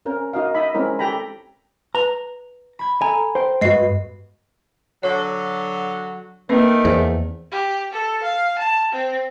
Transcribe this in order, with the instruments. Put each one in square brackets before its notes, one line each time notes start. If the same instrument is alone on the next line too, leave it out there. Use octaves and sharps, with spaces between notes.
[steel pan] C4 C#4 A#4
D#4 F#4 A#4 D#5 F5
D#4 D#5 E5 B5
G#3 C4 C#4 E4 A#4
G4 A4 G5 A#5 B5
[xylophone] B4 F7 [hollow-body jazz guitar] A#5
[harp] B5 G#6
[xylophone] A4 A#5 [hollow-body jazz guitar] G#5
[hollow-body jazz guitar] C5 G5 [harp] C6
[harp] G2 B3 [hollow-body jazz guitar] G#3 F#4 [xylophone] D#5 C7
[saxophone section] D3 F#3 [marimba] C#5
[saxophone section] D3 D#3 A3 [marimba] A#3 C4 B4
[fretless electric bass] E2 [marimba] C5
[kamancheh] G4
A4
F5
A5
C4